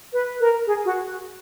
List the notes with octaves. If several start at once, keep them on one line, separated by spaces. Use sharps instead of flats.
B4
A#4
G#4
F#4